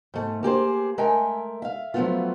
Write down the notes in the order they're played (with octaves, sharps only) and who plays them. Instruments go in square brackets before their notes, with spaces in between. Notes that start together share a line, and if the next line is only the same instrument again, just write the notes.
[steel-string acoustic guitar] G#2 A3
A#3 G4 G#4 C5
G#3 A3 A#4 E5 G5 G#5
E5 F5
F3 F#3 G#3 A3 B3 F4